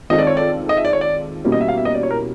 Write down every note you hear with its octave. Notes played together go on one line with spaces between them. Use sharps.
D#3 G#3 C4 F4 A4 D#5
D5
C#5
D5
D#5
E5
D5
C#5
D5
B2 G3 A#3 C#4 E4
D#5
E5
F5
E5
D#5
D5
C#5
A#4